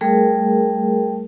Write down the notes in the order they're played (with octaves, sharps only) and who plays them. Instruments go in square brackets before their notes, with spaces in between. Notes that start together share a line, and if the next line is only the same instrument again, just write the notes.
[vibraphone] G3 A3 G#4 A#4